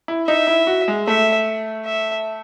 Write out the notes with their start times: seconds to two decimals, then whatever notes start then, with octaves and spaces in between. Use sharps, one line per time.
0.08 E4
0.27 D#4 E5
0.47 E4
0.67 F#4
0.88 G#3
1.07 A3 E5
1.86 E5